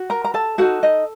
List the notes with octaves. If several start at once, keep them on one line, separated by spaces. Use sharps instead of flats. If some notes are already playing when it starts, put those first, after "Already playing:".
Already playing: F#4
A#4 A#5
A#5
A4 A5
D#4 F#4 A4 F#5
D#4 D#5